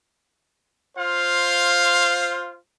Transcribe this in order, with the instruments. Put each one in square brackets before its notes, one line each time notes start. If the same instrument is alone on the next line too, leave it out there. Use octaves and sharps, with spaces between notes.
[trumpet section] F4 C5 F5